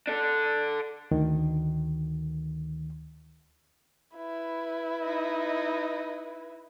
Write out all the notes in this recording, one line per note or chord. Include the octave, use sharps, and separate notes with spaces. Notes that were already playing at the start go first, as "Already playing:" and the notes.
D4 A4
D2 D#3
E4 B4
D#4 D#5